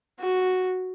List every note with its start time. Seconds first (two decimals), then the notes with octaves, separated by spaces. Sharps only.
0.20 F#4